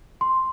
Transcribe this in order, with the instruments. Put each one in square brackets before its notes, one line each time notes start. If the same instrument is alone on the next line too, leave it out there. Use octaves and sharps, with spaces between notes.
[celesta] C6